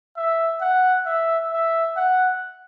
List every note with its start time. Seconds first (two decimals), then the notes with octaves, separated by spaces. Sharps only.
0.17 E5
0.61 F#5
1.06 E5
1.52 E5
1.96 F#5